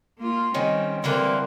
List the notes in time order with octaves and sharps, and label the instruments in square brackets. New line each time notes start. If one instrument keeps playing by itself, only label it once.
[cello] A#3 F4
[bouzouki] D#3 C#4 [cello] G3 C4
[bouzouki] D3 E3 A#3 [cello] G3 C4 [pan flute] A#4